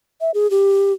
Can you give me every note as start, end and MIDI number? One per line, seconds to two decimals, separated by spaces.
0.21 0.31 76
0.34 0.50 68
0.51 0.93 67